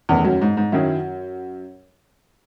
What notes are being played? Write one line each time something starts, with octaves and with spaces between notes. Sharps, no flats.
E2 D#3 A3 C#4
F#2
G#2
G#2
F#2 D#3 F#3 C#4 E4